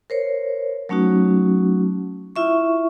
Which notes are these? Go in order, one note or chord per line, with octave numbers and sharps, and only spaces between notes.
A#4 C5 C#5
F#3 A3 C#4 D#4 F#4
E4 F4 E5 C#6